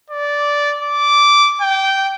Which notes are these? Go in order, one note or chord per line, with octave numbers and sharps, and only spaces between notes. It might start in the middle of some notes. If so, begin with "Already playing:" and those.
D5
D6
G5